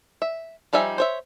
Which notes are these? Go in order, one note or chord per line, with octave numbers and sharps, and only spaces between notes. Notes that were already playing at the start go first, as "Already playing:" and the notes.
E5
F3 G3 D#4 E5 G#5
C5 C#5 E5